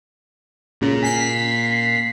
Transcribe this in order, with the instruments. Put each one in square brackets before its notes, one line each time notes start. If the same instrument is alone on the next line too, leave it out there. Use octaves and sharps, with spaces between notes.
[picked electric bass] A#2 [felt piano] C#3
[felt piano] G#5 [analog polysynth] B6 C7